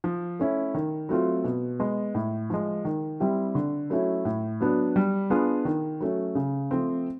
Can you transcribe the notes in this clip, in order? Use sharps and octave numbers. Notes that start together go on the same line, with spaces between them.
F3
A3 C#4 E4
D#3
F#3 A3 C4 F4
B2
G#3 B3
A2
F3 G#3
D#3
G3 C4 E4 G4
D3
F#3 A3 C#4 E4
A2
F#3 B3 D4
G3
B3 D4 F4 G#4
D#3
F#3 A3 C#4
C#3
F3 A3 C4